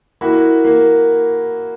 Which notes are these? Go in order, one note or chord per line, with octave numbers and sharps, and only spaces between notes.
A#3 E4 F#4
A#3